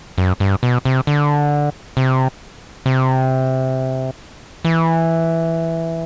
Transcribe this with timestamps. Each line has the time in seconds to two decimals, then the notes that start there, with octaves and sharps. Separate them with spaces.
0.18 F#2
0.40 G2
0.63 B2
0.85 C3
1.07 D3
1.97 C3
2.86 C3
4.65 E3